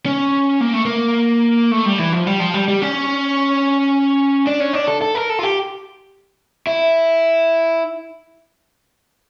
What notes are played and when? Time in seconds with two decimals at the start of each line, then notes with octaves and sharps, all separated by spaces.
0.06 C#4
0.61 A#3
0.73 A3
0.85 A#3
1.71 A3
1.86 G3
1.99 E3
2.12 F3
2.27 G3
2.40 F3
2.54 G3
2.68 G3
2.82 C#4
4.47 D4
4.60 C#4
4.73 D4
4.88 A4
5.02 A4
5.15 A#4
5.30 A4
5.39 F4
5.43 G4
6.67 E4